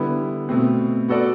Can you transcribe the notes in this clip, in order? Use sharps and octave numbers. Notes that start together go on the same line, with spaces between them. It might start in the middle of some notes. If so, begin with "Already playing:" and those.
Already playing: D3 G3 B3 E4
B2 A3 C4
B3 F#4 A4 D5